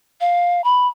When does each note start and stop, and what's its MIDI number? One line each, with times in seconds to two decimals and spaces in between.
0.21 0.64 77
0.64 0.87 83